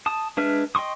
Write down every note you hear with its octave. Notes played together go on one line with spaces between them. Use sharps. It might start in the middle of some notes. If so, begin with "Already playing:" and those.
A5 D#6
G#3 D4 B4 E5 F6
D#5 G5 C6 C#6 D#6